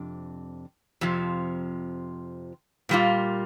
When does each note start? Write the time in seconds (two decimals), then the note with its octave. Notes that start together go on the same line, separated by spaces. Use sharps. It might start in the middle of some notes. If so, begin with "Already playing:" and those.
Already playing: F2 C3 D4
1.01 F2 C3 F3
2.89 A#2 G3 A#3 F4